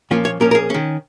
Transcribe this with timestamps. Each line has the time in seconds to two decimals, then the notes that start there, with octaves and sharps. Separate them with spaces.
0.11 A#2 F3 A#3 C#4 F4
0.25 C#5
0.40 A#2 F3 A#3 C#4 A#4
0.51 A#4
0.55 G#4
0.70 D#3 C#4